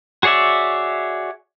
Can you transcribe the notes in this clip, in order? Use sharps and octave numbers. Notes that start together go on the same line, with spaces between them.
F#4 G#4 C#5 D5 E5